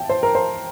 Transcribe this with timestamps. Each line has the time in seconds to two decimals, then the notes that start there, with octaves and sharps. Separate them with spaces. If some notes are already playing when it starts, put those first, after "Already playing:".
Already playing: G5 A5
0.10 C5
0.23 A#4
0.35 C5